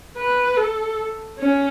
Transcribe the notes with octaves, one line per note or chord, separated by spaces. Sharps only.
B4
A4
C#4